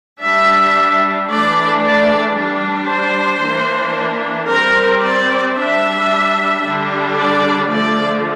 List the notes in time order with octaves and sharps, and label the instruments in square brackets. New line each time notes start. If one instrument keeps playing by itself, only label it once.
[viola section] G3 D4 E5
E3 A3 D4 D5
D5
G3 D4
C5
E3 A#3 D4
G3 C4 A#4
D5
G3 D4 E5
D3 G3 D4
D5
D3 F3 A3 D5